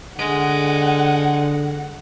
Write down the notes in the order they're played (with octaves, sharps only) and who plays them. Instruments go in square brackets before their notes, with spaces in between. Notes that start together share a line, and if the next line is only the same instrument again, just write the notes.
[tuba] D3 [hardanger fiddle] G#3 [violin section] F#5